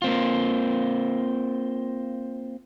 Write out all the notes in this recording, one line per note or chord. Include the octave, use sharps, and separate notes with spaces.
A#3 C4 F4